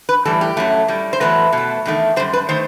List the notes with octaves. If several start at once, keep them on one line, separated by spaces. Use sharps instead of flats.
B4
A2 E3 G3 A4
G4
F#2 F#3 A3
A2 G3
C5
E2 C3 F#3 A3 B4
B2
A3
E2 D#3 A3
F#2 D#3 G3 C5
B4
D#3 A3 C5